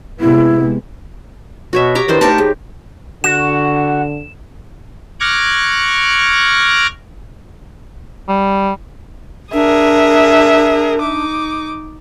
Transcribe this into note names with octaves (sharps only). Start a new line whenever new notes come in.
C3 G#3 B3 E4
B2 F#4 C#5 E5
G4 C#5 A#5 D6
D#3 D4 E4 B4 C5
A3 D#4 G4 A#4 A5
D#2 G#4
D3 F#4 E7
C#6 D6 F6 F#6 G#6 A#6
G3
D4 G#4 A#4 E5
D#4 D6